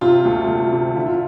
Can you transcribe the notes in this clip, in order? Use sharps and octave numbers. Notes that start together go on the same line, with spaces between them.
C3 F4
D2
D2
C3
D3 E4
F4